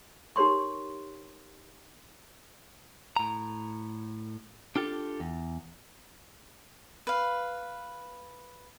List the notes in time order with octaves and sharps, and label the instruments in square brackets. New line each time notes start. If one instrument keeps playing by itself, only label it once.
[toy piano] D#4 G4 A#4 C#5 C6 C#6
[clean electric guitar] A2 A#5
D4 F4 G4 A4
E2
[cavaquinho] B4 F5